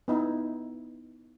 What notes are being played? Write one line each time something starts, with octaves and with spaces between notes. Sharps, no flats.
B3 D#4 E4